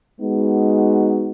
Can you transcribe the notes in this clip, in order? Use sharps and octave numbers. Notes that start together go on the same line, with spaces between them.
G#3 B3 D#4 F#4